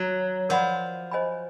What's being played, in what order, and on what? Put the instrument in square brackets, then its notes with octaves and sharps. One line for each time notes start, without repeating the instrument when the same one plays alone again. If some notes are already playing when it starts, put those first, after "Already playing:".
Already playing: [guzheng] F#3
[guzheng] F3 [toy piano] A#4 D5 F#5 B5
[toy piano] C5 D#5 G#5 B5